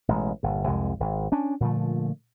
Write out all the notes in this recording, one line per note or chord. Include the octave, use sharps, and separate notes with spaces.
A1 B2 G#3
G1 A#2
C2 F2 C3 G#3
G#1
C#4 D4
A#2 D3 F3 A3